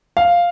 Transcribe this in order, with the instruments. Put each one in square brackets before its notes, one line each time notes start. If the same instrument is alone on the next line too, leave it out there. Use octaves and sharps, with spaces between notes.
[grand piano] F5